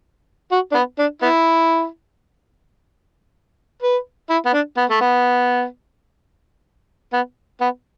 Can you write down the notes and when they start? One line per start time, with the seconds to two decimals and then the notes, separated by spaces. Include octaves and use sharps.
0.51 F#4
0.71 D4
0.74 B3
0.98 D4
1.22 B3 E4
3.82 B4
4.30 E4
4.45 B3
4.53 D4
4.77 B3
4.89 A3
5.01 B3
7.13 B3
7.61 B3